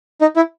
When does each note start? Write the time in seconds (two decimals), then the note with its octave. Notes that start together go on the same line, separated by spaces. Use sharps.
0.21 D#4
0.36 E4